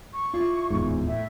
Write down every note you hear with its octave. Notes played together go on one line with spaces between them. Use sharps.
C#6
E4 F4 D5
D1 E2 G#2
A2 E5